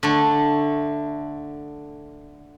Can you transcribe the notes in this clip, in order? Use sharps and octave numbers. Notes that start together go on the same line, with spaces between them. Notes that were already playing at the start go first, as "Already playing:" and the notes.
D3 A3